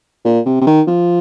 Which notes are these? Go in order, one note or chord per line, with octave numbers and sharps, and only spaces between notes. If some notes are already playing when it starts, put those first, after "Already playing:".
A#2
C3
C3
D#3
F3